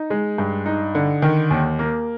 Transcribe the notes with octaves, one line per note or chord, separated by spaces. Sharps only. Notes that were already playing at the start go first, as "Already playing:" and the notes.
Already playing: D#4
G#3
G2
D#4
D3
D#3
D#2
A#3